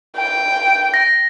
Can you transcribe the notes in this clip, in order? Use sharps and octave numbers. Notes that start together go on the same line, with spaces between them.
G5
A#6